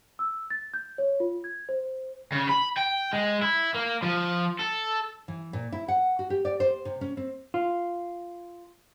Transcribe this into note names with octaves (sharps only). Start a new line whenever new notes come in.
E6
A6
G6
C#5
F4
G#6
C5
C#3
B5
G5
G#3
E4
A#3
F3
A4
E3
A#2
E4
F#5
F#4
G4
D5
C5
C3
C#4
C4
F4